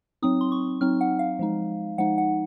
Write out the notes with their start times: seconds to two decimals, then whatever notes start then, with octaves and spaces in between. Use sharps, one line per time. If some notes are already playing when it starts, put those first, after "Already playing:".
0.22 F#3 C4 D#4 D#6
0.41 C6
0.52 C#6
0.81 F#3 C4 D#4 F6
1.01 F#5
1.19 F5
1.39 F3 G#3 D#4
1.98 F3 G#3 D#4 F#5
2.18 F#5